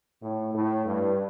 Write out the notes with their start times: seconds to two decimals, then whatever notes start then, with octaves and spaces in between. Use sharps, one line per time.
0.23 A2
0.54 A2
0.86 G2